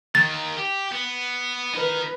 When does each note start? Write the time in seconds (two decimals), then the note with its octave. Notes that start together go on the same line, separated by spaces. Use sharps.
0.15 D#3 A#3 A6
0.57 G4
0.92 B3
1.74 D#4 A#4 B4